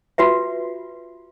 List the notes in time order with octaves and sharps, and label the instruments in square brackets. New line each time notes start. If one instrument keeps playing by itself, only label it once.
[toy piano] F4 F#4 B4 E5